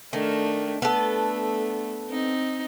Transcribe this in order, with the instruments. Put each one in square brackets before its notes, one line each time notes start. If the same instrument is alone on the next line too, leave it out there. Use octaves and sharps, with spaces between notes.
[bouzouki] D#3 [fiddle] A3 [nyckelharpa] D4
[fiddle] A3 [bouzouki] B3 A4 [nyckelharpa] D4
[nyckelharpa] C4 [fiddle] D#4